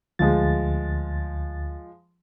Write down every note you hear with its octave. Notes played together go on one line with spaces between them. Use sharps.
D2 F3 G#3 A6